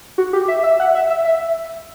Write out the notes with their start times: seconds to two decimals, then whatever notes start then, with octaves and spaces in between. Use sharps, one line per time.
0.18 F#4
0.33 G4
0.48 E5
0.63 E5
0.80 F#5
0.95 E5
1.10 E5
1.25 E5